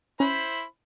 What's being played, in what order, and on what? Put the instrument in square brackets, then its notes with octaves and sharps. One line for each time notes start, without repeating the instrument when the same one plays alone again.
[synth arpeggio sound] C#4 [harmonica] E4 C5 B5